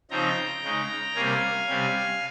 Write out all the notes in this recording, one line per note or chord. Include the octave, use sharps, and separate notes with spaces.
C#3 F3 C4 D#4 G5 A#5
C#3 G#3 D#4
C3 G3 A#3 C#4 F5 G#5
C3 G3 C#4